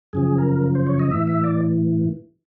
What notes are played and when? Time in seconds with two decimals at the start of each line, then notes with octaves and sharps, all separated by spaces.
0.13 F#2 C#3 F3 G#4
0.38 A#4
0.75 C5
0.87 C#5
0.99 D#5
1.11 A2 E3 E5
1.27 E5
1.44 D5